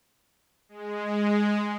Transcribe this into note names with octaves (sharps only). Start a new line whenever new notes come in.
G#3